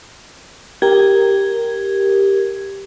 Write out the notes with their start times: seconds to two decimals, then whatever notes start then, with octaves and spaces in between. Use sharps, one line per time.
0.82 G4 A#4 G#6